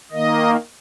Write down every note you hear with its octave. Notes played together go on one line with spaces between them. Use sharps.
D#3 A#3 D#5